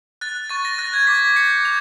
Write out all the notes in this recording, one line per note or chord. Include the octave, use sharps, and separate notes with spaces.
F#6 A6
C#6 A6
A#6
F#6 A6
G#6
D6 B6
G6 C#7
F7